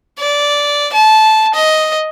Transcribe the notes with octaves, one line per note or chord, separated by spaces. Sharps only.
D5
A5
D#5